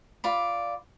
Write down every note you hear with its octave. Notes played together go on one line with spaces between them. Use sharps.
F4 D5 B5